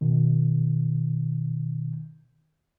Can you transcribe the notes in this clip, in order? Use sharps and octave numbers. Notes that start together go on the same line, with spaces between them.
B2 D#3